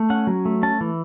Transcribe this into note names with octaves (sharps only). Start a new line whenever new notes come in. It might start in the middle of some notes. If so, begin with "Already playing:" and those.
Already playing: A3
C#4 F#5
F#3
A3
C#4 A5
E3